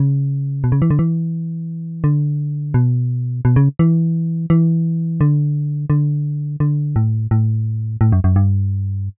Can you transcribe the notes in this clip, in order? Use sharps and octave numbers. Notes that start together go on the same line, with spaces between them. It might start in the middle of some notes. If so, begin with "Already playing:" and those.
Already playing: C#3
B2
C#3
E3
D3
E3
D3
B2
B2
C#3
E3
E3
D3
D3
D3
A2
A2
A2
F#2
F#2
G2